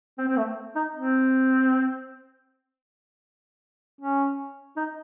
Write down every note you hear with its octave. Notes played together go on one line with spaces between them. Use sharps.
C4
C4
A3
D#4
C4
C#4
D#4